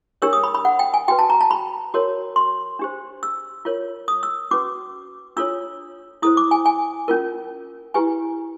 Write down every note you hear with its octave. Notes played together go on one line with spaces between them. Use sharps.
D4 G4 A#4 C#5 E6
D#6
B5
B5
F#5
G5
G#5
F#4 B4 G5
A5
A#5
A5
B5
F#4 A#4 C#5
C6
D4 G4 C5
E6
F4 A#4 C#5
D#6
E6
C#4 F#4 B4 D6
D4 F4 A4 C#5 E6
E4 A4 C5 D#6
D6
G#5
G#5
C#4 F4 A#4
E4 G4 B4 G#5